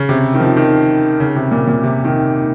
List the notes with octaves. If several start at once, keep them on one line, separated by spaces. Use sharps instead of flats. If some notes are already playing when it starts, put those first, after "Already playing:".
Already playing: C#3
C3
D#3
F3
D#3
C#3
C3
A#2
A#2
C3
D#3